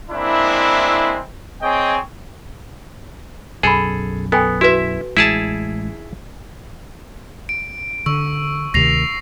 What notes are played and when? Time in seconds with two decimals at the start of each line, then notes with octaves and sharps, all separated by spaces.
0.11 G#3 A#3 C4 D4 E4
1.62 C4 G#4 C#5 D#5 G5 G#5
3.63 B1 F#2 G#4 A4 G#5 B5
4.32 B3 A4 G5 G#5
4.61 E4 F#4 B4 E5
5.17 A1 G#3 E4 G#4 A5
7.49 D7
8.06 D3 C#6 E6
8.74 D2 C3 D#3 A#6 C7 F7